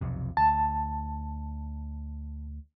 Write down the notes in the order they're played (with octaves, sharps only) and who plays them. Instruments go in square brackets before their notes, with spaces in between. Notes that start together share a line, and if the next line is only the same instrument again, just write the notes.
[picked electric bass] B1 F2 C3
[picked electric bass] D2 [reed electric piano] A5